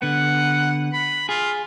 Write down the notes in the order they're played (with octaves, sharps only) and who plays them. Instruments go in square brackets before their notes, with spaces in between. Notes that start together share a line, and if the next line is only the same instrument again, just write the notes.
[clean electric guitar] D3 B3 [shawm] F#5
[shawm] B5
[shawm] F4 [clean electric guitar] G#4